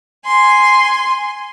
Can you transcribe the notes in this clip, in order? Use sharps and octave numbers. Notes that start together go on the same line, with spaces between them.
G#5 C6